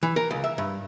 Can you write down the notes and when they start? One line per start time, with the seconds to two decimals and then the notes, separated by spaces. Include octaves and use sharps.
0.03 E3
0.16 A#4
0.31 C#2
0.44 E5
0.58 G2